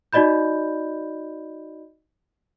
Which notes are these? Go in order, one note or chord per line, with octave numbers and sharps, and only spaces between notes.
D#4 F#4 D5 D#5 B5 G6